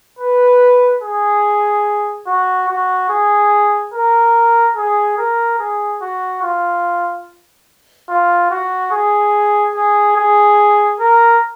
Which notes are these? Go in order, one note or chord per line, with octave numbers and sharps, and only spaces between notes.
B4
G#4
F#4
F#4
G#4
A#4
G#4
A#4
G#4
F#4
F4
F4
F#4
G#4
G#4
G#4
A#4